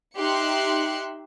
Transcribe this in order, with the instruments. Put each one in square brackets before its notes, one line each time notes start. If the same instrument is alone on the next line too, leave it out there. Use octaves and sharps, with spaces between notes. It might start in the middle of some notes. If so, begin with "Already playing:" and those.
[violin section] D#4 G4 E5 C6 F#6 C#7